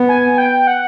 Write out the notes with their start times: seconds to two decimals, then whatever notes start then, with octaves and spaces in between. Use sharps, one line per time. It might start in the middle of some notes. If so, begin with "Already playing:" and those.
Already playing: B3
0.09 G#5
0.38 G5
0.67 F#5